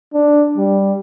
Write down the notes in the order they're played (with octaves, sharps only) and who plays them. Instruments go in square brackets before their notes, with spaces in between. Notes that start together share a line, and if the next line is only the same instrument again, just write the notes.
[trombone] D4
G3